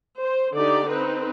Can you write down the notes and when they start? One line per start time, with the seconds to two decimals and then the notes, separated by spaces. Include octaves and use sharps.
0.21 C5
0.55 D3 D#4 G4 D5
0.87 C4 D#4 B4